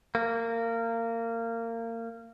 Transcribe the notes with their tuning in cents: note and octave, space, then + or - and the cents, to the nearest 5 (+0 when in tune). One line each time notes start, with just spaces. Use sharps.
A#3 -25